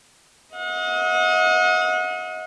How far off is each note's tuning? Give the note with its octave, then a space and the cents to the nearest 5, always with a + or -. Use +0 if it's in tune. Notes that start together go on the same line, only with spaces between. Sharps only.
D#5 +30 F#5 -35